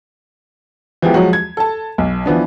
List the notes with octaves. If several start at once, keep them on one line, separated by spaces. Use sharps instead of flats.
E3 F3 G#3 B3 G4
F3 F#3 G#3 F#4
G#6
A4 A5
B1
E3 F3 B3 D4